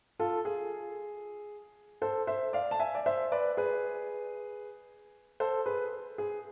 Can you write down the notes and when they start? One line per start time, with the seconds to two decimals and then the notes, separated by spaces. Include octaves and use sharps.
0.19 F4 A4
0.45 G#4
2.02 A4 C5
2.27 C5 E5
2.53 D5 F5
2.71 A5
2.80 E5 G#5
2.95 D5
3.06 C5 E5
3.32 B4 D5
3.57 G#4 B4
5.40 A4 C5
5.66 G#4 B4
6.18 G#4